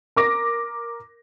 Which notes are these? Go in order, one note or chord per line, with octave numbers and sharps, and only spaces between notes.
A#4 D6 A#6